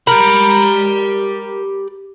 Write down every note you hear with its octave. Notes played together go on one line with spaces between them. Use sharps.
G4 A#4 B5